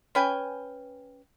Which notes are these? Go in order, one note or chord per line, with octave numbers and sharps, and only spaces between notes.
C#4 B4 G5 G#5